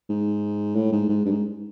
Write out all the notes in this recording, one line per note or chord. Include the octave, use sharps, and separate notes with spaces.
G#2
A2
G#2
G#2
G2
G#2